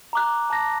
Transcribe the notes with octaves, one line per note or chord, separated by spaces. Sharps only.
A#5 D6 F#6
A5 D6 F#6 A#6